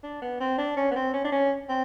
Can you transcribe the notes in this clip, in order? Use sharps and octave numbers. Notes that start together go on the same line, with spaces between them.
D4
B3
C4
D4
C#4
B3
C4
C#4
D4
C#4
C4